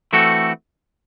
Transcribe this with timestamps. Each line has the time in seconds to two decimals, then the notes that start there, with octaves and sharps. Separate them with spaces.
0.13 E3 A3 C4 F#4 A4